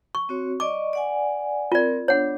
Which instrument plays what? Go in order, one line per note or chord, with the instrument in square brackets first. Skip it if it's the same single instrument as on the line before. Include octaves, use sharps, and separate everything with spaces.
[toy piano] C#6
[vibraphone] C4 F#4 C#5
[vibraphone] D5 D#5 C#6 [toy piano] D6
[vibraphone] D5 F#5 G#5
[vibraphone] C4 A#4 [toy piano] F4 D5
[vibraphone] B3 D4 [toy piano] C#5 F#5